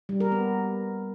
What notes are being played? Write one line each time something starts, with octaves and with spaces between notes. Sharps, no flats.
G3
A#4
B3